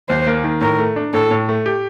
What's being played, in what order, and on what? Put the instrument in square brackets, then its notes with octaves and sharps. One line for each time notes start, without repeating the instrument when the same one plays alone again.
[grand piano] D#2 [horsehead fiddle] C5
[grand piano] A#3
D#3
[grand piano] A2 [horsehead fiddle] A#4
[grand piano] A3
D4
[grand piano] A2 [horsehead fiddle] A4
[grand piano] A2
A3
G4